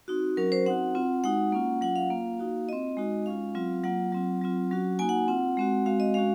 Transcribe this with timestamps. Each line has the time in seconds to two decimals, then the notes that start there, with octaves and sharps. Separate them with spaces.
0.08 C4 D#4 F#4
0.37 F#3 C#4 F#4 A#4
0.52 C5
0.66 C4 D#4 F#4 F#5
0.95 C4 F4
1.24 G#3 D#4 F#4 F#5
1.52 A#3 C#4 F4
1.81 F#3 C#4 F4 F#5
1.96 F5
2.10 A#3 F4
2.40 A#3 D#4 F#4
2.68 C4 F4 D#5
2.97 G#3 D#4 F#4
3.26 G#3 C#4 F4 F5
3.55 F#3 C4 F4
3.84 F#3 A#3 F4 F#5
4.12 F#3 C4 F4
4.42 F#3 C4 F4
4.71 F#3 C#4 F#4
4.99 A#3 D#4 F#4 G#5
5.09 F#5
5.28 C4 F4 F#5
5.57 G#3 C4 F#4
5.86 G#3 C4 F#4 F5
6.00 D#5
6.14 G#3 C#4 F#4 F5